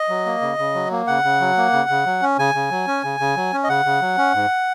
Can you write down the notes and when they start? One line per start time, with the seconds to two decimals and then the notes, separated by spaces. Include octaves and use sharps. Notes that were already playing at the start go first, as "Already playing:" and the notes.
Already playing: D#5
0.09 F#3
0.26 A#3
0.41 C#3
0.59 C#3
0.75 F#3
0.91 A#3
1.07 C#3 F#5
1.24 C#3
1.41 F#3
1.57 A#3
1.72 C#3
1.89 C#3
2.06 F#3
2.22 C#4
2.39 C#3 G#5
2.55 C#3
2.71 F#3
2.87 C#4
3.04 C#3
3.20 C#3
3.37 F#3
3.53 C#4
3.64 D#5
3.69 C#3 F#5
3.85 C#3
4.01 F#3
4.18 C#4
4.34 G#2